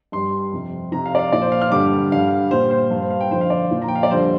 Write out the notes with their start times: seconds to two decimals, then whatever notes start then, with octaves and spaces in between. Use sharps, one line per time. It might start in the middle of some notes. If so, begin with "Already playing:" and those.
0.12 G2 G3 C6
0.52 F2 C3 G3
0.92 F2 C3 F3 A#5
1.06 F5
1.15 D5
1.19 F5
1.32 A#2 F3 D5
1.41 C5
1.52 F5
1.62 F6
1.71 G2 D3 G3 D6
2.12 G2 D3 G3 F5
2.51 A#2 G3 C5
2.71 C5
2.90 G2 G3 F5
3.00 C5
3.10 F5
3.21 G5
3.31 F2 D3 F3 C5
3.41 F5
3.50 D5
3.71 A#2 F3
3.82 A#5
3.88 G5
3.96 F5
4.03 D5
4.10 F2 D3 G3 C5